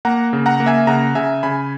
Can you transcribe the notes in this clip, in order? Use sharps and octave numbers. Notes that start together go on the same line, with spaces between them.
A#3 F#5 A#5
C#3
F#5 A#5
A#3
E5 G#5
C#3 F#5 A#5
C#3 E5 G#5
C#3 G#5 B5